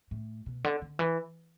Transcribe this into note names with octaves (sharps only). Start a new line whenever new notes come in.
A2
B2
D3
D3
E3